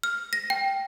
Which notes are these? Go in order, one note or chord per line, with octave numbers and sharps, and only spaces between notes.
F6
A#6
G5